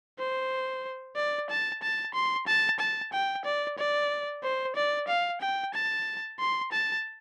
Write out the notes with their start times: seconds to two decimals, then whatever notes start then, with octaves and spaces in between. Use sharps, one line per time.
0.19 C5
1.16 D5
1.50 A5
1.82 A5
2.14 C6
2.47 A5
2.79 A5
3.13 G5
3.45 D5
3.78 D5
4.43 C5
4.76 D5
5.08 F5
5.41 G5
5.74 A5
6.39 C6
6.72 A5